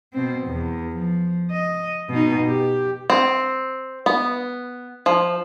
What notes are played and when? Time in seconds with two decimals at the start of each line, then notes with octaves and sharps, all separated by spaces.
0.13 B2 C4
0.47 E2
0.93 F3
1.51 D#5
2.10 B2 D#4
2.46 G4
3.10 C4
4.06 B3
5.06 F3